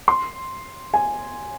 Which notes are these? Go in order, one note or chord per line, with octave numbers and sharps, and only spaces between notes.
C6
G#5